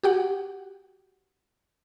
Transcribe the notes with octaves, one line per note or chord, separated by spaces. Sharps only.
F#4 G4 F#5